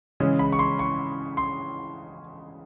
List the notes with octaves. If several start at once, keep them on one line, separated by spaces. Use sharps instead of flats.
C#3 E3 G#3 C#4
B5
C#6
C6
C#6
C6